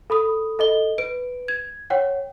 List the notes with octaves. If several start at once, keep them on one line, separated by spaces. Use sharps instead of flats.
A4 B5 D#6
A4 D#5 G7
B4 D7
G#6
C#5 F#5 G5